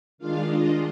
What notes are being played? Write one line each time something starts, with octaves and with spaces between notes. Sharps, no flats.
D#3 G#3 D4 F4 F5
D#5